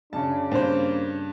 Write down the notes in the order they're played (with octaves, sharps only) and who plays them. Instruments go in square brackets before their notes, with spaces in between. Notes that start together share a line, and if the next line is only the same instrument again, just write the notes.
[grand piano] F#2 A5 [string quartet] C#3 [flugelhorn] D4
[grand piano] G2 [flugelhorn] A#3 [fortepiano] C4 C5